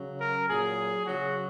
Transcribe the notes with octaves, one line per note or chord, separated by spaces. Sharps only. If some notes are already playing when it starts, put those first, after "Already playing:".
Already playing: C#3 F#3
A#4
A#2 F#3 G#4
C#3 F#3 F#4